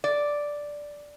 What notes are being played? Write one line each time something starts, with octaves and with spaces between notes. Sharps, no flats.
D5